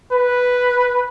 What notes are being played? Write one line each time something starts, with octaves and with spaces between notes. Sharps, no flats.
B4